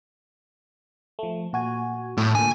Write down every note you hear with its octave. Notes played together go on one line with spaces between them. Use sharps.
F3 A3
A#2 F#4 G#5
A2
A#2 D3 G#5